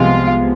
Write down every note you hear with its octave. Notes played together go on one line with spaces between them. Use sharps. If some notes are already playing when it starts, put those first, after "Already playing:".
Already playing: C2 C3 F3 G#3 B3 F4